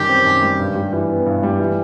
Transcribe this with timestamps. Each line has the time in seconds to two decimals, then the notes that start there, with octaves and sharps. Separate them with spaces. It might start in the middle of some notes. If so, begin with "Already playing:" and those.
Already playing: F#2 D#3 G3 G4
0.09 C4
0.26 F#2
0.43 G3
0.60 G2
0.75 G3
0.93 E3
1.09 B3
1.26 G2
1.43 G3
1.60 E3